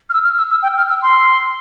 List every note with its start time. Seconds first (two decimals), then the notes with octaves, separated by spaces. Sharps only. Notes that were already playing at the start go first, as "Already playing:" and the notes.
0.09 F6
0.13 E6
0.23 F6
0.37 E6
0.51 E6
0.63 G5
0.77 F6
0.89 E6
1.02 C6